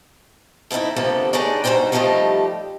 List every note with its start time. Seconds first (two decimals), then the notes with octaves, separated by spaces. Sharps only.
0.70 A3 B3 C4 D#4 E4
0.96 D2 C3 F3 A#3 B3 A4
1.33 D4 D#4 G#4 B4 C#5 D5
1.64 G2 B2 F3 D#4 C5 G5
1.92 D#3 F3 G3 A3 G4 D#5